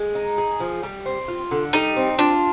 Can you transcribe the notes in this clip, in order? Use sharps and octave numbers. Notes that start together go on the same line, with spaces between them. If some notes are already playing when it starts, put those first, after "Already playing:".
Already playing: G#3
D#4
G#4
F3
G3
C4
F4
D3
G3 D#4
C4
D4 F4